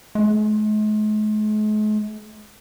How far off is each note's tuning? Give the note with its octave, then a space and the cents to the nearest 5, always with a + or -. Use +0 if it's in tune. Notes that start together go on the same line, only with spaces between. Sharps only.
G#3 +45